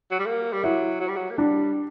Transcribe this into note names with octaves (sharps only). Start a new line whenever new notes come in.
F#3
G3
A#3
G3
F#3 E4
F#3
G3
F#3
A#3
G3 D4